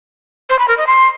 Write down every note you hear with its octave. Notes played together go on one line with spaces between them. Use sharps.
C5
B5
A#4
D#5
C6